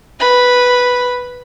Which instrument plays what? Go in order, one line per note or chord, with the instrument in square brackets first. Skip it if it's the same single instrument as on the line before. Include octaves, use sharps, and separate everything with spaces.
[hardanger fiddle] B4 B5